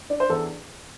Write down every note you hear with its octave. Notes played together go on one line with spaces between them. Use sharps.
D4 D5
C5
E2 A4